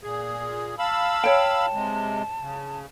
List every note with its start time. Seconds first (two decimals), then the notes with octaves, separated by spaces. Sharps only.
0.04 A#2 G#4
0.79 F5 A5 B5 E6
1.24 C#5 G5
1.73 C3 G#3
2.40 C#3